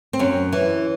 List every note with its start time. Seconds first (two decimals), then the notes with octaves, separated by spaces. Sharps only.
0.13 C4
0.19 F#2 C#4
0.53 E3